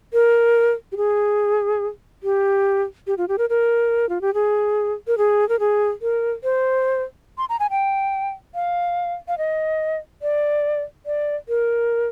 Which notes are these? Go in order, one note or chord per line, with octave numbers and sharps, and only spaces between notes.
A#4
G4
G#4
G4
G4
F4
G4
A#4
A#4
F4
G4
G#4
A#4
G#4
A#4
G#4
A#4
C5
C6
A#5
G#5
G5
F5
F5
D#5
D5
D5
A#4